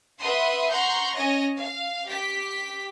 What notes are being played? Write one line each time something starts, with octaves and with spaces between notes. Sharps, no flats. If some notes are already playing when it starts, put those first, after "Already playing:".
B4 E5 F#5 C6 D#6
F#5 A#5 C6 C#6 G6
C#4 C#5 D#5 A#6
F5
G4 B6